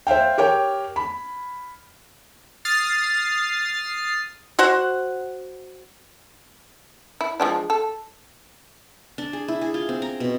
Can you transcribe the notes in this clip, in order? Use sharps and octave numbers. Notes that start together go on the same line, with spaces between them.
C5 E5 F5 G5
G4 A#4 C#5 G5
B5
D#6 F6 A6 C7
F#4 C5 F#5
E4
F3 G#3 D4
A4
D4
G#4
E4
G#4
F4
C4
A#5
B2